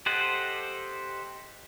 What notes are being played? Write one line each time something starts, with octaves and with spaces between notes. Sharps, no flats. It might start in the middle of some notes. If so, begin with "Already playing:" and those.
G4 A4 C5 D#5 F#5